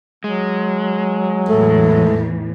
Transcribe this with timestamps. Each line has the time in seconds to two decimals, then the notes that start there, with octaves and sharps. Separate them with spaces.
0.24 F#3 G#3
1.49 E2 A2 E3 A3